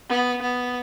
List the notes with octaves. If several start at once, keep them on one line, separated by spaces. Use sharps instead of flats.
B3
B3